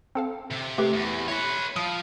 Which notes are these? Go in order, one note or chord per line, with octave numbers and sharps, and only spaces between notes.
C4 A4 F5
C3
A3 G4 B4
E2
E4 B4 C#5 A#6
F3 D#6